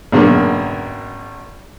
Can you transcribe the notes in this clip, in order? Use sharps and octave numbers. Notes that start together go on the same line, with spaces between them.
G#1 F#2 B2 D3 A#3